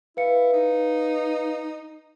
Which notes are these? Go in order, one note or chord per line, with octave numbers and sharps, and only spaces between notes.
E4 B4 F5 C#7
D#4